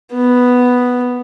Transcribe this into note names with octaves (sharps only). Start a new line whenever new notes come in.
B3